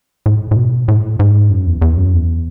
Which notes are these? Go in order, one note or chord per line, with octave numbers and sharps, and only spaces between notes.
A2
A2
B2
A2
G#2
F#2
E2
E2
F#2
E2